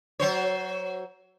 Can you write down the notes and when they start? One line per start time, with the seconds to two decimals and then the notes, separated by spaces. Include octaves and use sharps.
0.20 F#3 C5 C#5